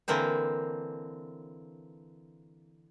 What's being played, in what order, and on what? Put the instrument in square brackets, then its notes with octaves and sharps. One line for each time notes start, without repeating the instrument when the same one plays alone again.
[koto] D3 E3 A#3 C4 C5